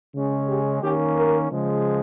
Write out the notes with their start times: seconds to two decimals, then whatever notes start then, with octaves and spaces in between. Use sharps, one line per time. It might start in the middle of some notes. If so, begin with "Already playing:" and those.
0.14 C#3 G#3 C#4
0.48 G4
0.82 D#3 A#3 C#4 G4
1.16 A#4
1.50 C#3 F3 G#3